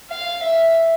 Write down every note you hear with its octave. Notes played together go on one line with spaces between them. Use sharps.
F5
E5